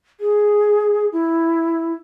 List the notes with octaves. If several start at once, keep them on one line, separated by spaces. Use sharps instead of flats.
G#4
E4